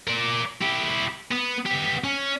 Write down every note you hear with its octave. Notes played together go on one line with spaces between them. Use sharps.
A#4 D5
E4 G4
B3
B3 G4
C#4